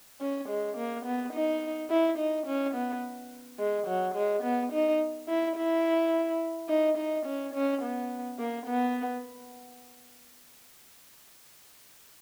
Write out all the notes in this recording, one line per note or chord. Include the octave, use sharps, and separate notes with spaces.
C#4
G#3
A#3
B3
D#4
E4
D#4
C#4
B3
G#3
F#3
G#3
B3
D#4
E4
E4
D#4
D#4
C#4
C#4
B3
A#3
B3